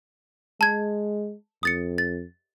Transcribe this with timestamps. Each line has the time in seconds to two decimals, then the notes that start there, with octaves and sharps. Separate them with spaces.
0.61 G#3 A5 G#6
1.63 F2 D#6 A6 C#7
1.98 A6